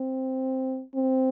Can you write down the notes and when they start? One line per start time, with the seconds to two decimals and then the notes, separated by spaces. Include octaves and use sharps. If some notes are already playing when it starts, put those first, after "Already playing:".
Already playing: C4
0.95 C4